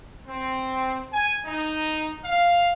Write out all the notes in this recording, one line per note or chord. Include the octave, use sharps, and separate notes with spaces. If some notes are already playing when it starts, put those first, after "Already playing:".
C4
G#5
D#4
F5